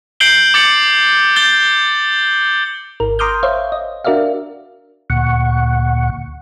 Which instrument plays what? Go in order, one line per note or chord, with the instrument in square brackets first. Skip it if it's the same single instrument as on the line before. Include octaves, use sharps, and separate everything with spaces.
[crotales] G6 C7 D7 F#7 G7
D6 A6 C#7 F#7
G6 A6 G7
[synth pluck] G#1 A#4
A#5 C6 D6 D#6 F6 G6
C5 C#5 E5 F5
D#5
D4 F#4 A#4 D5 E5 F5
[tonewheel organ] D2 A#2 F#5 C#6